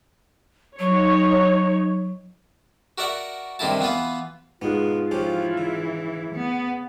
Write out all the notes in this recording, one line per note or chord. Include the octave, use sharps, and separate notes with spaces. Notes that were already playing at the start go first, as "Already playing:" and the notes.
F#3 D#4 C#5
F#4 A#4 D5 E5 F#5
G2 C3 D#3 D#4 E4 A5
E3 B3 F4 B4
G#2 B2 G#3 B3 F4
E3 F3 C#4 G4
C#3
B3